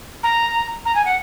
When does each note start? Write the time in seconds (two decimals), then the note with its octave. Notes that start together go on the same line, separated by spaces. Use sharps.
0.23 A#5
0.85 A#5
0.95 G#5
1.05 F#5